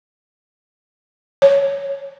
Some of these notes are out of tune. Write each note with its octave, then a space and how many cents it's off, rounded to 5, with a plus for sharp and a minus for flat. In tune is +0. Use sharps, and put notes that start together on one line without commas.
C#5 +5